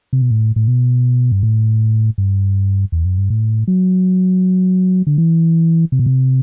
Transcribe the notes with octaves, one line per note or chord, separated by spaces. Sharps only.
C3
B2
A2
A2
B2
G2
A2
G2
E2
F#2
G2
A2
F#3
D3
E3
C3
B2
C3